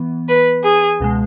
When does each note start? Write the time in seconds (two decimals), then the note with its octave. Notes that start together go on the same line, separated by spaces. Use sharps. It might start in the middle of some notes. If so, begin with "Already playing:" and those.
Already playing: E3 B3
0.29 B4
0.64 G#4
1.00 C#2 B2 G#3